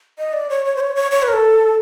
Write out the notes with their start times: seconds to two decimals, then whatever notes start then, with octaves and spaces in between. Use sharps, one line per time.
0.18 D#5
0.33 D5
0.50 C#5
0.66 C#5
0.76 C5
0.80 C#5
0.96 C#5
1.11 C#5
1.23 B4
1.28 A#4
1.33 A4